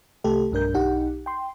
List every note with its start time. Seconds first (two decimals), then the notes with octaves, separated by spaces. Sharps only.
0.24 C2 C3 A3 G4 A4
0.52 B1 G2 D4 A#4 G6
0.74 B1 D#4 G4 F#5
1.26 G5 C6